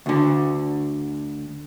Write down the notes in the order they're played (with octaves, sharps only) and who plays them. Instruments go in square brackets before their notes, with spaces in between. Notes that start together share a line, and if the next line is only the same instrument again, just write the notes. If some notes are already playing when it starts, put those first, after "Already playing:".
[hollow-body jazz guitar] D2 D3